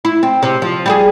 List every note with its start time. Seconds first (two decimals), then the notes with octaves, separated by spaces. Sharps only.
0.05 E4
0.23 C4
0.42 C3
0.62 F3
0.86 G3 F#4 G#4